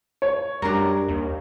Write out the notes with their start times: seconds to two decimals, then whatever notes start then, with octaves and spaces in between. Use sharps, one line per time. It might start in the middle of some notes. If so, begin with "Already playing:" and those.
0.22 C#5
0.62 F#2 G3 D4 A#4
1.08 D#2 A#3